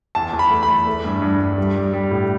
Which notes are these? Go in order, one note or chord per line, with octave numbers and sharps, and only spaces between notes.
E2 A5
E2
B5
A3
B5
E2
A3
G2
G2
G2
G3
G3
G3
A2